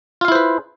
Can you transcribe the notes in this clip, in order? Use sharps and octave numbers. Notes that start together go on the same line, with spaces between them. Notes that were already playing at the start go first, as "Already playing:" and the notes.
E4 F4 B4 C5 F5